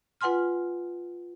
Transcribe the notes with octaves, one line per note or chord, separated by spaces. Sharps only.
F4 B4 F#5 G#5 C6 F6